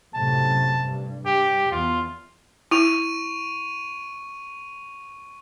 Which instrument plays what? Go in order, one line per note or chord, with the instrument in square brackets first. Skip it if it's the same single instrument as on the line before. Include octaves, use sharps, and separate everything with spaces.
[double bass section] F#2 A2 C3 [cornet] A5
[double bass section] G2
[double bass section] G2 [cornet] G4
[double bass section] E2 [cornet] F4
[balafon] E4 [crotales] C#6 D#7 F7